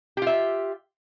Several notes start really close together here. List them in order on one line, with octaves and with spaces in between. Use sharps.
G4 F4 E5